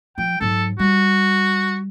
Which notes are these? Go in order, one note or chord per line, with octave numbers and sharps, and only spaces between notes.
F3 G5
G#2 F#3 A4
G3 F#4